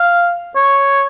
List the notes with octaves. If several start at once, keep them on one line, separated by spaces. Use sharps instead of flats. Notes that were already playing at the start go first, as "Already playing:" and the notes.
Already playing: F5
C#5